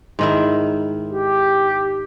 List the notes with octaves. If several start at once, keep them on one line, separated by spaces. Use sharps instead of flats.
G#2 D#3 E4
G4